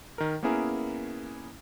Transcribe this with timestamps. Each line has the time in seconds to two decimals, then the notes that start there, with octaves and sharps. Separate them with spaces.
0.18 D#3 A#4
0.43 A#3 B3 C#4 E4 G#4 A#4